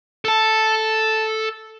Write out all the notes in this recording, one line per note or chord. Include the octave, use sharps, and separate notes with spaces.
A4 A5